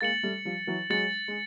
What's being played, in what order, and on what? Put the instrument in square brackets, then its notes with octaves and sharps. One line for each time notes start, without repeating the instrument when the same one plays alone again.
[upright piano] G#3 A#3 [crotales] A6 C#7 F#7
[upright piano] G3 A3
F3 G3
E3 F#3
[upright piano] F#3 G#3 [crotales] A6 C#7 F#7
[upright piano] G#3